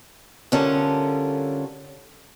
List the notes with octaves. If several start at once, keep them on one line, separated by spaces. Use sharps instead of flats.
D3 G3 C#4 F4 A4 A#4